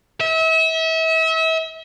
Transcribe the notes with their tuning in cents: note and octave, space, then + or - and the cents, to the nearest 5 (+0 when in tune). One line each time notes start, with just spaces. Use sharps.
E5 -35